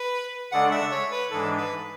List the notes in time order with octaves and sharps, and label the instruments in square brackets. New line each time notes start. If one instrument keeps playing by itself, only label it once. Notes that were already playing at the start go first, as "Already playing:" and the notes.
Already playing: [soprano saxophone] B4
[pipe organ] C#3 G#3 D4 A4 D5 [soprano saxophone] F#5
[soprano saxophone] E5
C#5
B4
[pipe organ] G#2 E3 G#3 D4 [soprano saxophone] A4
[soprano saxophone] B4